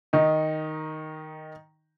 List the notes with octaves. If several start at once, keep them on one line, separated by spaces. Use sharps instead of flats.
D#3 D#4